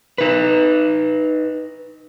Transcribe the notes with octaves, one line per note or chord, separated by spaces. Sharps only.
D#4 B4